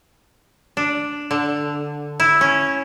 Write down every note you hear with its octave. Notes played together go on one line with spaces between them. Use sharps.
D4
D3
E4
C#4